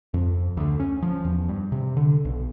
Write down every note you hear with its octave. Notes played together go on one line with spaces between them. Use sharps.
F2
D2
C#4
F3
E2
G2
C3
D3
B1